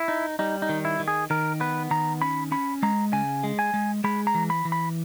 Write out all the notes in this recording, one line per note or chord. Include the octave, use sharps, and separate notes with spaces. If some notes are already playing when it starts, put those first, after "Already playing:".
Already playing: E4
D#4
G3 D#4
D#4
D#3
E4
D#3
G#4
D#3 A#4
B3 B4
D#3 A#5
C#4 B5
C#4 B5
G#3 A#5
C#3 G#5
G#3
G#5
G#3
G#3 B5
A#5
E3
B5
E3
B5